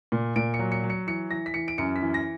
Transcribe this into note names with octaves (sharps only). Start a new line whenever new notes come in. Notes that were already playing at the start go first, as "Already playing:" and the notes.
A#2
A#2 D7
C#7
F#3
C#7
F#3
C#7
E3 C#7
E3 A#6
B6
E3 C#7
D7
F#2 C#7
B6
E3
A#6